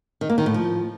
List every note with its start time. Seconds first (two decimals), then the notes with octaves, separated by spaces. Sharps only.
0.21 D#3
0.29 A#3
0.38 D#3
0.46 A2
0.54 F3